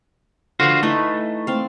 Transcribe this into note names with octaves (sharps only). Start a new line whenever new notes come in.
D3 F4 F#4 B4 C5
E3 A3 D#4 B4
C4 F5